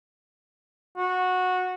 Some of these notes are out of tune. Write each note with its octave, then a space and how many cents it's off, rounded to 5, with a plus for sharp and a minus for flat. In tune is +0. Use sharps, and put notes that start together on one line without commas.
F#4 -15